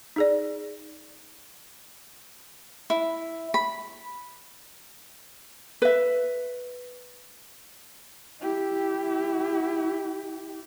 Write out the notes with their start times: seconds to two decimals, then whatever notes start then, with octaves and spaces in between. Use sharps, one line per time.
0.16 D#4 G#4 D5
2.90 E4
3.54 B5
5.82 B4 E5
8.41 E4 G4